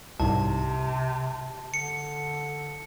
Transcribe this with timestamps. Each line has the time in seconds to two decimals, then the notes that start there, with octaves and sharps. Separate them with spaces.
0.20 C2 G#2 C3 A5
1.74 D3 C#7